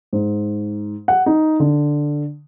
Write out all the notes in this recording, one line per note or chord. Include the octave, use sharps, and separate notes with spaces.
G#2
F#5
D#4
D3